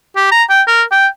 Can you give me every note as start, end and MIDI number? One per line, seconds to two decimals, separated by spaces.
0.16 0.30 67
0.32 0.43 82
0.50 0.62 79
0.67 0.83 70
0.92 1.07 79